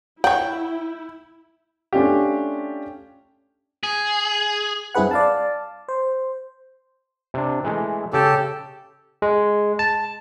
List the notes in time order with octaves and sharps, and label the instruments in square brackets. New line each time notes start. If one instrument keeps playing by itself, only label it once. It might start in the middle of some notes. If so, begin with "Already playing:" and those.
[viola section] E4 [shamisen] C#5 F#5 [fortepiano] G5
[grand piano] A3 C#4 D4 F4 G4
[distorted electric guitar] G#4
[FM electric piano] G2 C4 E4 G#4 B4 F#5
D5 F5 A5
C5
[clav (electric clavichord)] C3 D4
E3 G#3 A3
[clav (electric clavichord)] C#3 G5 [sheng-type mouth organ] G4 A4
[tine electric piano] G#3
A5